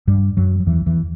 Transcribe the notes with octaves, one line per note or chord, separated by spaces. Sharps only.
G2 G3
F#2 F#3
F#3
E2 E3
E2 E3